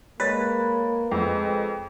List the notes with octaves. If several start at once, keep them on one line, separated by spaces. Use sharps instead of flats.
G#3 A#3 B4 C#5 A6
F2 G#3